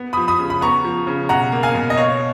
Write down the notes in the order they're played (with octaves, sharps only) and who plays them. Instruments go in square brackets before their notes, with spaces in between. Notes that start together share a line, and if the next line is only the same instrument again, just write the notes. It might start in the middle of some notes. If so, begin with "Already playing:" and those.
Already playing: [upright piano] B3
F3 B5 D#6
B5 D#6
C#3
B5
B3 A#5 C#6
F3
C#3
B2 F#5 A#5
A#3
F5 G#5
B2
D#5
B3 C#5 F5